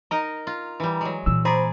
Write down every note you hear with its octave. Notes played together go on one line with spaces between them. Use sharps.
D#4 A#4 D#5 A#5
F4
E3 G3
F#3 G#3
A#2 E3 E6
G#4 C5 D5 A#5 B5